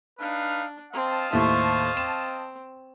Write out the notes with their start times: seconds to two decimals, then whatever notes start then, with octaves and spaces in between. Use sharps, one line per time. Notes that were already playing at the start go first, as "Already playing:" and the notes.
0.20 D4 D#4 B4 F5
0.94 C4 D#5 F5 A5
1.32 D#2 A2 C5 E5 C#6
1.97 C4 E7